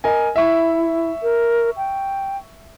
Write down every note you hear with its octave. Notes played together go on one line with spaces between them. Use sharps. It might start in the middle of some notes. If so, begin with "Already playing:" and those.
A#4 D#5 G#5
E4 E5 C#6
A#4
G5